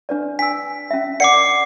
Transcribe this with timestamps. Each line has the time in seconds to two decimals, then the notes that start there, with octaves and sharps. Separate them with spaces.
0.09 D4 B4 D5
0.39 G#5 E6 B6
0.91 C#4 E5
1.20 A#4 D5 F#5 D6 C7 C#7